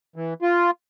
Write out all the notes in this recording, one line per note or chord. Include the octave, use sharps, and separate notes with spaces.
E3
F4